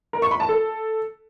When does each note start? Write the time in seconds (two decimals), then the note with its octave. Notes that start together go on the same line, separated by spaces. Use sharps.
0.13 A#4
0.22 C#6
0.31 B5
0.40 A5
0.49 A4